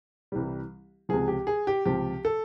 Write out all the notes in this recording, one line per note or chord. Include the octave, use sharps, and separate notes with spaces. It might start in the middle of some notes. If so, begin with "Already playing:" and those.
C2 C3 E3 G3
C#2 C3 F3 G#4
G4
G#4
G4
C#2 C3 F3 G4
A4